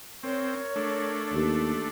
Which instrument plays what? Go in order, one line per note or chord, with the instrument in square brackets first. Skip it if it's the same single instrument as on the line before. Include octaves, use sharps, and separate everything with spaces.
[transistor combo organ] C4 [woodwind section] A#4 C#5
[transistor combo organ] A3 D4
[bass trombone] D#2